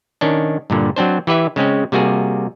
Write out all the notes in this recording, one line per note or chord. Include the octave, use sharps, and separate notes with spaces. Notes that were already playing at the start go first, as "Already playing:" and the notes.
D#3 C#4 D4
G2 A#2 D3
F#3 C4 D4 C5
E3 G4 B4 E5
C#3 G#3 C4 C#4
C3 G3 A#3 F#4 G#4